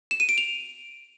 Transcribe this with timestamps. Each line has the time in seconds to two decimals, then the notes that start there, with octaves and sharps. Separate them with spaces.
0.11 E7
0.20 D#7
0.29 D7
0.38 F7